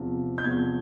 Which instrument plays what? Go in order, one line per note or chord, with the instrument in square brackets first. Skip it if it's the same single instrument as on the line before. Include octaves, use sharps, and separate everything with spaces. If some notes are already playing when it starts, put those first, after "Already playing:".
Already playing: [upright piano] E2 C3 F3
G6
E2 C3 F3 G#6